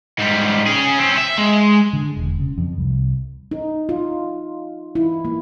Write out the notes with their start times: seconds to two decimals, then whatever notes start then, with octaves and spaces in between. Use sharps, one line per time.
0.18 G#2 G3
0.66 C#4 G#4
0.98 C4 C#4
1.17 E5
1.38 G#3
1.93 D3
2.17 E1
2.39 C#3
2.58 F2
2.78 C2
3.51 D#4
3.89 F4
4.95 E4
5.25 A#3